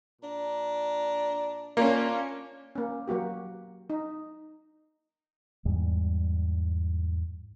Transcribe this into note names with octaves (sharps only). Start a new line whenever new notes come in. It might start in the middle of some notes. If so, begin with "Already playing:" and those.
A#2 D4 A#5
A#3 C#4 D4 F4 C#5
A#3 C#4
F#3 A#3 F#4 G4
D#4
E2 G#2 G3 G#3